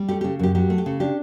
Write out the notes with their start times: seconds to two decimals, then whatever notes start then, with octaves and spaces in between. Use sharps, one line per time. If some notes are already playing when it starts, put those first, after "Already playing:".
Already playing: G3
0.09 A3 G4
0.21 C#3 G4
0.39 F#2 G4
0.55 F#3 G4
0.70 A3
0.78 G4
0.86 C#3
1.00 D4 G4